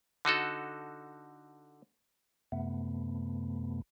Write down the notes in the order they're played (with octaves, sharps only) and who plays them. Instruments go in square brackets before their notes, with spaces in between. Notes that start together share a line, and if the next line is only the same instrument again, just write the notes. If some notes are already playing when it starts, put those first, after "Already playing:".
[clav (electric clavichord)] D3 D#4 F#4 A4
[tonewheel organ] F#2 C3 A3 B3